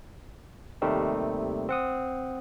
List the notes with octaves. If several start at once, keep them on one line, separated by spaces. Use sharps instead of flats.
D#2 C3 D#3 G3 A3 C4
C4 F#5 D#6